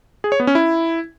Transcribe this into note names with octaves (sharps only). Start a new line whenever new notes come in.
G#4
C#5
B3
C#4
E4